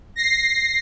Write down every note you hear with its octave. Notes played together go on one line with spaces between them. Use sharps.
A#6 C7